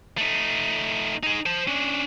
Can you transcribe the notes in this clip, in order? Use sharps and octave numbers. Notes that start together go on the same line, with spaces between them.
A3 D#4
D#4 G#4
C5 A5
C#4 D4